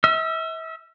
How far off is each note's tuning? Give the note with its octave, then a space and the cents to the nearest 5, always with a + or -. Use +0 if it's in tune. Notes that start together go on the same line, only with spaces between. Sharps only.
E5 -35 E6 +40